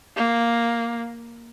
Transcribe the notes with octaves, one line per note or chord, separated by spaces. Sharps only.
A#3